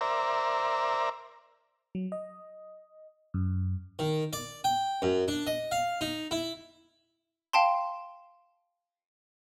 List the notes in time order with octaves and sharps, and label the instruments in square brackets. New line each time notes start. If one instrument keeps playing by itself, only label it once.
[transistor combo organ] A#4 C5 D5 E5 A#5
[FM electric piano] F#3
D#5
F#2
[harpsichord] D#3
D5
G5
F#2
D4
D#5
F5
D#4
E4
[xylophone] F5 G5 A5 C6